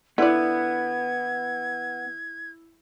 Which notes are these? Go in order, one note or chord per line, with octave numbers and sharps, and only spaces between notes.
D3 B3 E4 D5 G#6